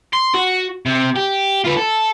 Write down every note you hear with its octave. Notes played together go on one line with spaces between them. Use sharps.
C6
F#4
C3
G4
F4 B4
A4